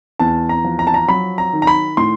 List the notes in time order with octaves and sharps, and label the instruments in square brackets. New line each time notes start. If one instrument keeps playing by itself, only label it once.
[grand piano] E2 A5
A#5
F3
A#5
A5
A#5
F#3 B5
A#5
D#3
A#5
B5
A2 C6